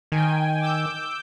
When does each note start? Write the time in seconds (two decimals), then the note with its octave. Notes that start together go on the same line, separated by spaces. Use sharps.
0.12 D#3 G5 G#5
0.61 D6 E6 G6